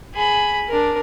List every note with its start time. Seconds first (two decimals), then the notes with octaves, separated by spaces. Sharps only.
0.14 G#4 B5
0.68 D4 A#4